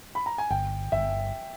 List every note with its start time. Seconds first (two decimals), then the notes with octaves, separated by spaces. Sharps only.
0.15 B5
0.26 A#5
0.38 G#5
0.50 G1 G5
0.92 G1 E5